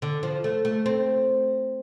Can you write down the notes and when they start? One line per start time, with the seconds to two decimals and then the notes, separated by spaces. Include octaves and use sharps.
0.02 D3
0.23 F3
0.44 A3
0.65 A3
0.86 C4